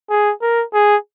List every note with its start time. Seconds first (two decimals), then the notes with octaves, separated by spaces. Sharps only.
0.10 G#4
0.42 A#4
0.74 G#4